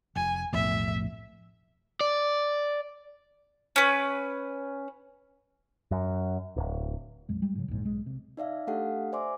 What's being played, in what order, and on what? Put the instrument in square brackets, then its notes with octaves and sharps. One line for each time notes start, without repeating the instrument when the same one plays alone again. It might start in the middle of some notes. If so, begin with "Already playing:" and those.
[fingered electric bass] F1 [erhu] G#5
[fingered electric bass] B1 F2 A2 [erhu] E5
[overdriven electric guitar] D5
[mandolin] C#4 B4
[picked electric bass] F#2
D1
[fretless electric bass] A#1 F2 F#3 G#3
G3 G#3
G#2 C#3 F#3
A#1 E2 G#2
B1 G#3
C3
[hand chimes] D#4 D5 E5 F5
A3 D4 G4 A4 F5 F#5
C5 D5 E5 G#5 C6 D6